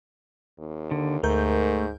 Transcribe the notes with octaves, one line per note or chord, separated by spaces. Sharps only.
D#2
D3
D2 G#2 A3 A#4 G6